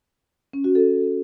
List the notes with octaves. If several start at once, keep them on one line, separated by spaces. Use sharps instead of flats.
C#4
F#4
A4